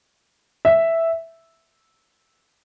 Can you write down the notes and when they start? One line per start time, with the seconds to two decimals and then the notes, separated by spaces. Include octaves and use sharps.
0.65 E5